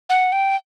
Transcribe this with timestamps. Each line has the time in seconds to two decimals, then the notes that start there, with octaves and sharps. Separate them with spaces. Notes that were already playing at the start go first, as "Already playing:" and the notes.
0.10 F#5
0.32 G5